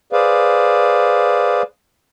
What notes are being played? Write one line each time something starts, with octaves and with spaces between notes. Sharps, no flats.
G#4 B4 C5 D5 F5